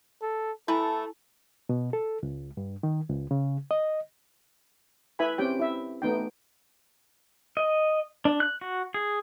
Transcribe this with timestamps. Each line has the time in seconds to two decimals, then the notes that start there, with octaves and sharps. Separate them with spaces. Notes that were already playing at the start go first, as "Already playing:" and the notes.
0.22 A4
0.68 A3 E4 A4 B4 G#5
1.69 B2
1.93 A4
2.23 C#2
2.57 G2
2.83 D#3
3.09 C#2
3.31 C#3
3.71 D#5
5.19 E4 B4 E5 G#5 B5
5.38 C4 C#4 G4 G5
5.59 E4 E5
6.02 A3 B3 D#4 G5
7.57 D#5
8.25 D4
8.40 F#6
8.61 F#4
8.94 G#4